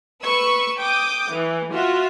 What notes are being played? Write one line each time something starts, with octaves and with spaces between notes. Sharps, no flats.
B4 C#6 E6
G5 D6 D#6
E3
F4 F#4 E5